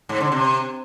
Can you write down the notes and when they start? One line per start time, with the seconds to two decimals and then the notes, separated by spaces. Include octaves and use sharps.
0.09 G#2
0.20 D3
0.32 C3